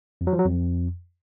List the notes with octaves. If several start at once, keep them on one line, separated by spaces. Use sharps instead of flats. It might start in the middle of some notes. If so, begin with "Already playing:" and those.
F2
F#3
F3
F#3
F2